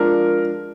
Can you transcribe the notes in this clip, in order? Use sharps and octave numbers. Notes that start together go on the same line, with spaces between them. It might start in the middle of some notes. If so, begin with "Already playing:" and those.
Already playing: F3 G#3 D4 F4 A#4